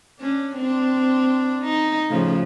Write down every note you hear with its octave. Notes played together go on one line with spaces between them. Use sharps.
C#4 D4
C4 D4
D#4
A2 C#3 F3